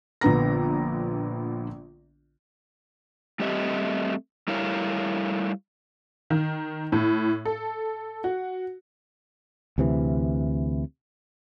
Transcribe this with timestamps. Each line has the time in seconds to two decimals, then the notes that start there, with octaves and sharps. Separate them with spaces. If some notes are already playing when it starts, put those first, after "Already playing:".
0.21 A#1 D3 B3 A#5 A#6
3.40 G3 A3 C4 G4 D#5 E5
4.48 G3 A3 E4 A#4 C#5 F5
6.30 D#3
6.92 A2
7.45 A4
8.24 F#4
9.78 D2 C3 E3